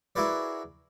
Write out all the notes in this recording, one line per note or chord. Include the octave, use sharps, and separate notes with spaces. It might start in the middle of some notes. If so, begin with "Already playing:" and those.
E4 F#4 G#4 A#4 B4 D5